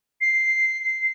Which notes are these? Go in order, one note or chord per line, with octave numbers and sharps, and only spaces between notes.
C7